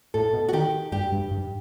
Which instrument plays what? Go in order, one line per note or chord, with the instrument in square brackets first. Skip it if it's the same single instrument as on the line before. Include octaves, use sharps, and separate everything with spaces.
[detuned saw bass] A2 [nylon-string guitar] A4
[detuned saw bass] B2
[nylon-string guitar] F#4
[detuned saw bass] D#3 [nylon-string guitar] G4
[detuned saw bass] G2 [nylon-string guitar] G4
[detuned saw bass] G2
G2